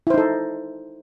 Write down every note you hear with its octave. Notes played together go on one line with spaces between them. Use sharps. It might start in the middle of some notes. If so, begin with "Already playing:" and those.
D#4 E4 A4 C5